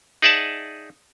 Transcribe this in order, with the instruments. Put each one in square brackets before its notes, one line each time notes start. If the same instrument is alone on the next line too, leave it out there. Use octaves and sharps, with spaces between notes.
[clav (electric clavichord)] D#4 G#4 D5 E5 F#5 A5